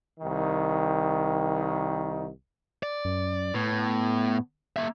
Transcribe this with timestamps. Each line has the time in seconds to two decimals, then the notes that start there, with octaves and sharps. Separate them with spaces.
0.20 C2 D#3
2.83 D5
3.05 F#2
3.54 A2 B3
4.76 A#3 E5